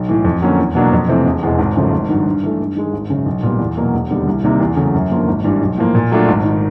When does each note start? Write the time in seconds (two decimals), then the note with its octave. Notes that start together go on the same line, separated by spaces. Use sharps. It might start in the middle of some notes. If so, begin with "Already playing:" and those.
Already playing: B1
0.09 A2 E3
0.24 F2
0.42 D3 F#3 A#3 C#4
0.59 E2
0.75 B2 F#3 A#3 D4
0.92 F2
1.08 C3 E3 A3 C4
1.26 E1
1.43 E2 B2 G#3
1.58 G#1
1.76 F#2 C#3 F3 A3
1.92 G#1
2.09 G2 D#3 F#3
2.25 G2
2.43 E3 A3
2.60 G2
2.76 D#3 G#3
2.93 G#1
3.10 F#2 C#3
3.26 B1
3.43 A#2 G3 B3
3.60 E2
3.77 B2 F#3 A#3
3.93 E1
4.10 D#2 D3 G3 B3
4.27 C2
4.44 C3 D#3 G3 A#3
4.60 E2
4.76 C#3 F#3 A3
4.94 F#2
5.11 D3 F3 A#3
5.28 G#1
5.44 G2 E3 G3
5.61 B1
5.78 A2 F3 A#3
5.95 A#2
6.12 F#3 A3 D4 F4
6.28 G#1
6.44 D#3